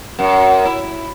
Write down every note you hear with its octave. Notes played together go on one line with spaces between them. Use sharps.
F#2
E4